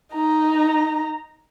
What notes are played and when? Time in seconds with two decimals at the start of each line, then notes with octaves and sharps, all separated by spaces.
0.14 D#4 A#5